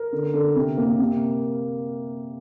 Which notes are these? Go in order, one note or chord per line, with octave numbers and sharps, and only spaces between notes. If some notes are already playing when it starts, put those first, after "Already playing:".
Already playing: A#4
D3
D3
C3
A#3
C3